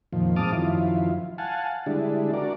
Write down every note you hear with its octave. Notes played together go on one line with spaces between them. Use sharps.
F2 A#2 D#3 F3
G#2 C4 A5 D6 D#6 F6
F#2 D#3 F3 E4 F4
F5 F#5 G#5 A5
D3 G3 G#3 D4 E4
D4 F#4 A#4 D5